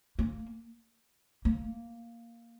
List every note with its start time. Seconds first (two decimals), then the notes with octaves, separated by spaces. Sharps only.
0.19 A#3
1.45 A#3